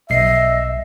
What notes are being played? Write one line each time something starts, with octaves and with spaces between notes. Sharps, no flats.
B1 D#5 E5 C7